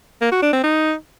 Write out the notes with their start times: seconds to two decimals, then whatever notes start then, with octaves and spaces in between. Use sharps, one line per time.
0.21 A#3
0.32 F#4
0.42 D4
0.53 C4
0.64 D#4